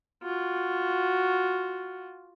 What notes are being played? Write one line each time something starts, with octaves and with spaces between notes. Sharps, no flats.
F4 F#4